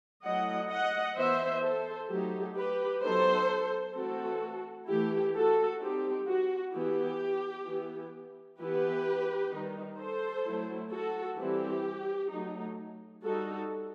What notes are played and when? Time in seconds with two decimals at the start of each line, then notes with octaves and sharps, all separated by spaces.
0.24 F#3 A3 E4 D#5 F#5
0.70 D#5 F#5
1.16 E3 B3 E4 C5 E5
1.63 A4 C5
2.09 F#3 A3 D#4 G4
2.56 G4 B4
3.02 F#3 B3 D#4 A4 C5
3.95 E3 A3 C4 F#4 A4
4.88 E3 A3 E4 G4
5.34 F#4 A4
5.81 G3 C4 D#4 G4
6.27 F#4
6.74 E3 B3 E4 G4
7.67 E3 B3 E4
8.60 E3 B3 E4 G4 B4
9.52 D#3 G3 D#4
9.98 A4 C5
10.45 F#3 A3 E4
10.91 F#4 A4
11.38 E3 G3 C4 E4 G4
12.30 F#3 A3 D#4
13.23 G3 D#4 F#4 A4